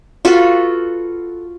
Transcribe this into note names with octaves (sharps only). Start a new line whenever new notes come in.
F4 F#4 A4 B4